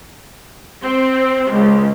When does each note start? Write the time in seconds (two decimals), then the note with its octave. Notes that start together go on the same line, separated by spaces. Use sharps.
0.82 C4
1.51 C#2